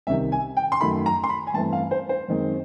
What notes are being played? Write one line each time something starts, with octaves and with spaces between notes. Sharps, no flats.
C2 C3 D#3 E5
G#5
G5
C6
F#2 D#3 F#3 A3 B5
A#5
C6
B5
G#5
G2 E3 A3 C4 A5
F5
C5
C5
F#2 D#3 G#3 C4